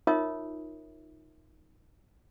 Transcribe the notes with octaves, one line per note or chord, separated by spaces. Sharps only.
D#4 F4 A#4 C#5 E5 D#6